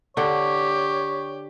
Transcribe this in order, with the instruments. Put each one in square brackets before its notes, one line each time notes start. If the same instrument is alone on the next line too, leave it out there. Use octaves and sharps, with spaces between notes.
[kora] D3 F#5 [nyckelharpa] G4 [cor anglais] C#5